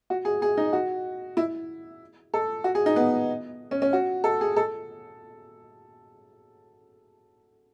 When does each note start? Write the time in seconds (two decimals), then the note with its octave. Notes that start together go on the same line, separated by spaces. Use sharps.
0.10 F#4
0.25 G#4
0.42 G#4
0.57 D#4
0.73 F#4
1.37 E4
2.34 A4
2.64 F#4
2.75 G#4
2.86 D#4
2.96 B3
3.71 C#4
3.82 C#4
3.93 F#4
4.24 A4
4.41 G#4
4.56 A4